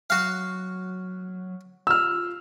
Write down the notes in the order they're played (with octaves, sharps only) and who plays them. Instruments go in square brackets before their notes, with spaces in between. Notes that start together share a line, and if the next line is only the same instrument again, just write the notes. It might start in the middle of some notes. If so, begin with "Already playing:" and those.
[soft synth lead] F#3 [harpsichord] F#4 F5
[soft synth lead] F4 [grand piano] E6 F6